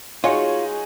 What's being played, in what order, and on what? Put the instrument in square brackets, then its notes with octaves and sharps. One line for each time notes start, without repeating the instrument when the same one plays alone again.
[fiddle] G#3 [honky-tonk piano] D#4 F#4 G#5 [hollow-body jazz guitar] F4 [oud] C#5